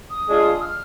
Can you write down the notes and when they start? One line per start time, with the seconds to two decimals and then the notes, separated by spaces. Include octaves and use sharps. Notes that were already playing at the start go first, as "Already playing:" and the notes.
0.10 D#6
0.28 G#3 D4 F4 G#4
0.62 F6